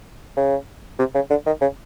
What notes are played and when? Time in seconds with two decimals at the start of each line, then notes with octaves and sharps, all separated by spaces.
0.37 C#3
0.99 C3
1.15 C#3
1.30 D3
1.46 D#3
1.62 C#3